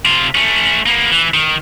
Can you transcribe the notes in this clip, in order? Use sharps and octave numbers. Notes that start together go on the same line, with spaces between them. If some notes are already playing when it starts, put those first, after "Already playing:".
C3 F4
A3 C#4
A#3 B3
E3
D#3